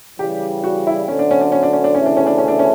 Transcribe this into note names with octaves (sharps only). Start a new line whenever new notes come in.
C#3 E3 G3 G4
F#4
E4
D2 D3 F#3 C#4
D4
C#4
D4
C#4
D4
C#4
D4
D2 C#3 E3 A3 C#4 E4
D4
C#4
D4
C#4
D4
C#4